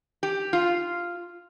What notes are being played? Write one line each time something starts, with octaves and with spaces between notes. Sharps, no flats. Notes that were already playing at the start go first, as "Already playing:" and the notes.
G4
F4